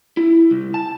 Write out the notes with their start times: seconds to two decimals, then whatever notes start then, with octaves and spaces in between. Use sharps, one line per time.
0.17 E4
0.51 C2
0.74 A5